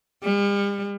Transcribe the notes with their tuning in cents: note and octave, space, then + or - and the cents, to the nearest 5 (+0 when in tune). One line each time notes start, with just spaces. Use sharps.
G3 +45